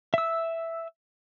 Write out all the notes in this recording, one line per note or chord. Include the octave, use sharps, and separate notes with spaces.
E5 E6